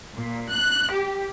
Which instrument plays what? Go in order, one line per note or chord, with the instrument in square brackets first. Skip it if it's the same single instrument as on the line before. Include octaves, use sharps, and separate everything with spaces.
[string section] A#2
F#6
G4